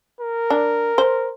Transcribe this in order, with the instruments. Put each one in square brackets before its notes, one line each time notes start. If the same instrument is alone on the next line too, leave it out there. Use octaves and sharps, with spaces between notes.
[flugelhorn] A#4
[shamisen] D4
C5